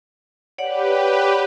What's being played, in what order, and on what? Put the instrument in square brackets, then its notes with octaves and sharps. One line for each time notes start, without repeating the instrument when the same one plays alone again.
[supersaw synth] G4 B4 [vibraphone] C#5 D5 F#5